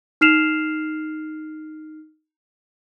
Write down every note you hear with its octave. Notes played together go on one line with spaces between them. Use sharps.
D#4 F6 C7 E7 F7